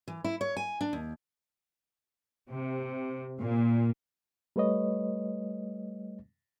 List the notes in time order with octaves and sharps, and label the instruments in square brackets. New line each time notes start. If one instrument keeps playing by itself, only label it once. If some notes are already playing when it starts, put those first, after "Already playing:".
[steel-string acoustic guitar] E3
E4
C#5
G#5
D4
D#2
[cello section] C3
A#2
[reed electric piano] G3 A3 B4 C#5 D#5